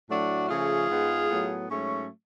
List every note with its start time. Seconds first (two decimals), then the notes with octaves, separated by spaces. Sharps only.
0.09 A2 F#3 A3 D4 F#4
0.49 C#3 F3 A3 F4 G#4
0.89 G#2 G#3 B3
1.29 A2 F#3 B3
1.69 G#2 F#3 A3 C#4